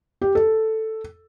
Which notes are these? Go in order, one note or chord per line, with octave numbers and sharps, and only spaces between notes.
G4
A4